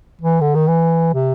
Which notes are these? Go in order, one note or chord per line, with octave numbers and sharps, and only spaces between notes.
E3
D3
D#3
E3
C3